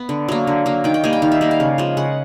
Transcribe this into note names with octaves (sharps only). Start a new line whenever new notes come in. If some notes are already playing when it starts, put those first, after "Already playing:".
Already playing: B3
D3
F#3 A#3
D3
F#3 A#3
D#3 G5
G5
G3 A#3 G#5
G5
D#3 F5
E5
G3 A#3
F5
C#3
F3 G#3
C#3 F#5